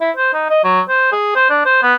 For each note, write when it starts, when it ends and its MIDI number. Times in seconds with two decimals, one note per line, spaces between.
0.01 0.11 64
0.17 0.29 72
0.33 0.50 63
0.50 0.63 75
0.64 0.81 54
0.89 1.09 72
1.12 1.35 68
1.35 1.47 72
1.50 1.63 62
1.65 1.81 72
1.83 1.94 59